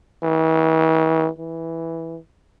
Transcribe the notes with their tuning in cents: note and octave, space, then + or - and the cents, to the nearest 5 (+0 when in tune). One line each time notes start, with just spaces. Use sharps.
E3 -45
E3 -5